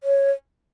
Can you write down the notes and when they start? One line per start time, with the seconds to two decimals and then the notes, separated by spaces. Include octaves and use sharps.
0.03 C#5